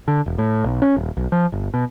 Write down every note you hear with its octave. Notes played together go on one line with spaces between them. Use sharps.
D3
E1
A2
B1
C#4
D#1
B1
F3
G1
B2